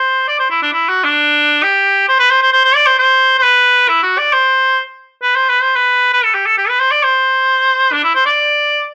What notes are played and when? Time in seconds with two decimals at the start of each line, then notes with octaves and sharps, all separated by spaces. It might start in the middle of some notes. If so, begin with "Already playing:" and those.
Already playing: C5
0.28 D5
0.39 C5
0.50 E4
0.62 D4
0.73 E4
0.88 F#4
1.04 D4
1.63 G4
2.08 C5
2.19 B4
2.31 C5
2.42 C5
2.52 C5
2.65 C5
2.75 D5
2.86 C5
2.99 C5
3.38 C5
3.43 B4
3.88 E4
4.03 F#4
4.18 D5
4.33 C5
5.22 B4
5.35 C5
5.49 B4
5.63 C5
5.76 B4
6.13 B4
6.24 A4
6.34 G4
6.46 A4
6.58 G4
6.69 B4
6.80 C5
6.91 D5
7.03 C5
7.92 D4
8.03 E4
8.15 C5
8.26 D5